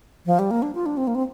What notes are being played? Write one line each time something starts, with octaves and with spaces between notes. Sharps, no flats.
F3
G3
A#3
D4
F4
D4
C4
A#3
C4